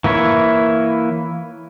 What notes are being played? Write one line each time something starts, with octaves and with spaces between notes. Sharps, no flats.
E3 A#3 E4 C#5